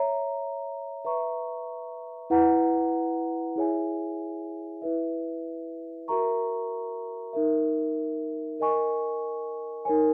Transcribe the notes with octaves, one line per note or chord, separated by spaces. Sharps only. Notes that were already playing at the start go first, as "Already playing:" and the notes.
Already playing: C#5 E5 A#5
B4 E5 A#5 C#6
E4 B4 F#5 A#5
E4 G#4 C#5 E5 G#5
E4 B4 E5
F#4 A#4 E5 A#5 C#6
D#4 A#4 E5
A#4 D#5 G#5 C#6
D#4 A#4 C#5 G#5